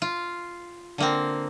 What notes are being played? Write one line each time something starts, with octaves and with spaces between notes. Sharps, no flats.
F4
D3 A#3 C4